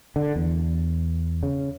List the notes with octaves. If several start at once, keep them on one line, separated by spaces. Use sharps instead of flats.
D3
E2
C#3